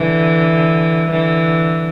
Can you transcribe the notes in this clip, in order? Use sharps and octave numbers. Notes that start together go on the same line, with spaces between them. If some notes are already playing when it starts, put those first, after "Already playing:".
Already playing: D3 E3
D3 E3